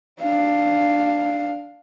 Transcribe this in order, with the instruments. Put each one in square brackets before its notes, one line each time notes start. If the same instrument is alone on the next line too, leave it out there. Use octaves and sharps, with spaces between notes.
[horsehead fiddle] D4 F5